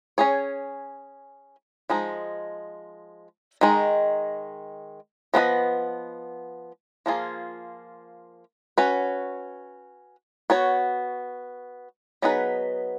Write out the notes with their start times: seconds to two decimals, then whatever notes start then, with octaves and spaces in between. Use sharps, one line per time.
0.18 C#4 G#4 C#5
1.90 F3 G#3 D#4
3.61 D#3 G#3 D#4
5.34 F3 B3 F#4 B4 D#5
7.06 F3 A#3 F4 G#4
8.78 C#4 F#4 B4
10.50 B3 F#4 C#5
12.22 F#3 B3 D#4 G#4 B4